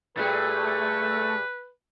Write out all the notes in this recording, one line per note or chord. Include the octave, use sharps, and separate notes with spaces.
A#2 G3 A3 G#4 B4